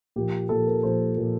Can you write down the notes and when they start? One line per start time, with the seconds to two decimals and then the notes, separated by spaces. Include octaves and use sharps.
0.16 A#2 F3 A#3 G4
0.49 A#2 F3 A#3 A4
0.67 A#4
0.83 A#2 F3 A#3 C5
1.17 A#2 F3 A#3